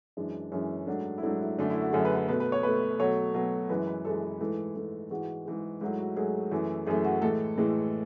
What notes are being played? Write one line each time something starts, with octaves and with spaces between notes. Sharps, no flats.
F#2 E3 G#3 D4
F#2 E3 G#3 C#4
G#2 F#3 A3 D4
E4
G#2 F#3 A3 D4
E4
F#2 D3 A3 D4
E4
F#4
F#2 D3 A3 G#4
B4
B4
B2 A3 B4
B4
C#5
B2 A3 B4
B2 F#3 A3 C#5
B2 F#3 A3
F#2 E3 G#3 B4
B4
F#2 E3 G#3 A4
A4
G#2 E3 A3 A4
G#2 E3 A3
G#2 E3 G#3 F#4
G#2 E3 G#3
G#2 F#3 A3 E4
F#4
G#2 F#3 A3 G#4
F#2 E3 A3
F#2 E3 A3 G#4
F#4
A2 E3 G#3 A4
A2 E3 G#3